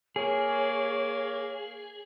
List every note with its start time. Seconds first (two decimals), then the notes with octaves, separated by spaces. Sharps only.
0.16 A#3 G#4 C#5